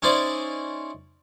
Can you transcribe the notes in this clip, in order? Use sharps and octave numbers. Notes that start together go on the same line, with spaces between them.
C#4 D#4 E4 C5 D5